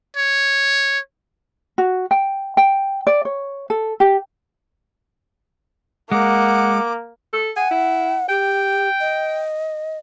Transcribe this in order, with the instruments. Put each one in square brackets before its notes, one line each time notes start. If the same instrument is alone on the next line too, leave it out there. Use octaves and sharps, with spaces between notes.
[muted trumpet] C#5
[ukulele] F#4
G5
G5
D5
C#5
A4
G4
[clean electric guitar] G#3 [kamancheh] A#3 [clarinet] F#5 [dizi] D6
[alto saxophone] A4
[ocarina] F#5 [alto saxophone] G#5
[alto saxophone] E4
[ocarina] G4 [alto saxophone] G5
[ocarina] D#5